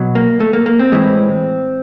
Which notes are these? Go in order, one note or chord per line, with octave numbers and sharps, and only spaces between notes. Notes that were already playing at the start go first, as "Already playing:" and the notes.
Already playing: B2 F#3
A#3
A3
A#3
A#3
C4
A2 E3 G#3